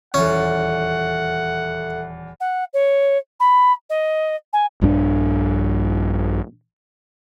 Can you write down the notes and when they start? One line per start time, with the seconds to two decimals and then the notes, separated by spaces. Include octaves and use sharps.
0.14 D#1 E2 C#4 A4 E5 F#5
2.40 F#5
2.73 C#5
3.40 B5
3.89 D#5
4.53 G#5
4.81 A#1 G2 C#4 D4